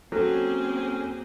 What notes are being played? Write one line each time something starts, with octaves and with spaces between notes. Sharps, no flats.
F#3 A#3 C4 C#4 G#4 A4